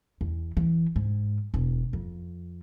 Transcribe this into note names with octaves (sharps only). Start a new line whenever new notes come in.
E2
E3
G#2
E1
F2